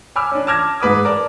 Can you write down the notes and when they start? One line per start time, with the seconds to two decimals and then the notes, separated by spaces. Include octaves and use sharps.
0.16 G#5 B5 D6 E6 F6
0.31 C#4 D4
0.47 A5 D6 F6 G#6 A#6
0.80 G#2 G#3 B4 D6 D#6
1.05 A#4 D5 A5